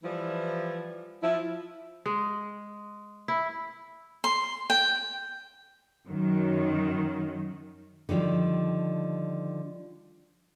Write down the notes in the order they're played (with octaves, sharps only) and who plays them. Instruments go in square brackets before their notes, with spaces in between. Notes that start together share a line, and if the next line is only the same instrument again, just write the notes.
[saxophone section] E3 F3 G3 E4
F3 E4
[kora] G#3
E4
[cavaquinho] C6
G5
[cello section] F#2 D#3 F#3
[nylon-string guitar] D3 D#3 F3 G3